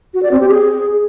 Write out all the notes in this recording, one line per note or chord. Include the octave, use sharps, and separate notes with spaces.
F#4
D5
C4
G4
G#4